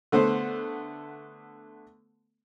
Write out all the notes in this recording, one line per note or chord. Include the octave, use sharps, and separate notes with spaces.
D3 A3 B3 C5